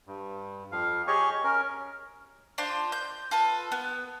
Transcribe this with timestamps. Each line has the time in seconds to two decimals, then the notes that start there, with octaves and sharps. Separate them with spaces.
0.07 G2
0.72 F2 F3 F5
1.07 G4 G#4 C#5 D#5 G#5 C#6
1.44 C#4 A#4
2.58 D4 F4 C5
2.92 G6
3.31 F4 A4 B4
3.72 B3